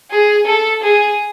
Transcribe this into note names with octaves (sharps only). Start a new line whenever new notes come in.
G#4
A4
G#4